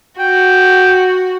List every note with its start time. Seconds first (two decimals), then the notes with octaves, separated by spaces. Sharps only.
0.19 F#4 G5